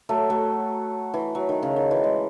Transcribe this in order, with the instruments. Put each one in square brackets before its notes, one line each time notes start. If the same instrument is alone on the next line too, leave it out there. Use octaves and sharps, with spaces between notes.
[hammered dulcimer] F#3 A3
F#3 A3
E3
F#3
D#3
C#3
D#3
E3
G#3